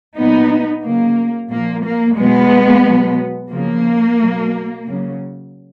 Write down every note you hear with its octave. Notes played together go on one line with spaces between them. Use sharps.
A#2 F#3 B3 D#4
C#3 F#3 A#3
A#2 F3 A#3
A#3
B2 F#3 G#3 B3
B2 F#3
C#3 F3 A#3
B2 F#3
C#3 F#3